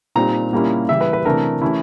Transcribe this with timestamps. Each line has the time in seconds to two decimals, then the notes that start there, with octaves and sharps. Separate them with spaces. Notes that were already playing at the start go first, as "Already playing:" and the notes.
0.16 A#2 G3 C4 D#4 A#5
0.52 A#2 G3 A#3 C#4 E4
0.89 C#3 E3 G3 E5
1.01 B4
1.13 B4
1.25 C3 E3 A3 D4 A#4
1.61 E3 A3 C#4 E4